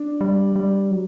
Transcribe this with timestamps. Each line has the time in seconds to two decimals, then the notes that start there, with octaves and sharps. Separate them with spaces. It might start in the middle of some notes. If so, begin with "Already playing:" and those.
Already playing: D4
0.21 G3
0.56 G3
0.91 F#3